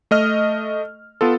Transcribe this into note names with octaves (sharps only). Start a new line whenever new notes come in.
A3 D#5 F6
B3 F4 A4